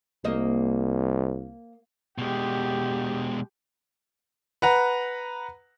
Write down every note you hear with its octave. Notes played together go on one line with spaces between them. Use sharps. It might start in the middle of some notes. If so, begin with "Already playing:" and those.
C2 A#3 C5 D#5
B2 G#3 G4
B4 F#5 A#5